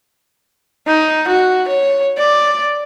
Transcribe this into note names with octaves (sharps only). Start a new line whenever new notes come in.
D#4
F#4
C#5
D5